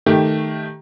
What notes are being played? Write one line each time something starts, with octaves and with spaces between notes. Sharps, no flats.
D#3 A3 G4